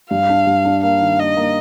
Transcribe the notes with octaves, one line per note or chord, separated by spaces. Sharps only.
G2 F5
D4
G2
D4
A#3 F5
D#3
A#3 D#5
A#3